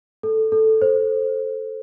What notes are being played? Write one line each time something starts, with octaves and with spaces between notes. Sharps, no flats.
A4
A4
C5